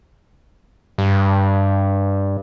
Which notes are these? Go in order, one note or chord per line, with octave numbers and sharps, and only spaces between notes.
G2